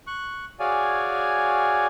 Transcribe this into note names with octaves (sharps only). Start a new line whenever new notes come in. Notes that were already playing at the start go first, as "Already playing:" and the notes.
C#6 F#6
F#4 G#4 C#5 D5 F5 G#5